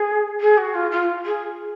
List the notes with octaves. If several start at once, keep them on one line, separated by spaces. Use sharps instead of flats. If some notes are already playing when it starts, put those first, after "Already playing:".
Already playing: G#4
G#4
F#4
F4
F4
G#4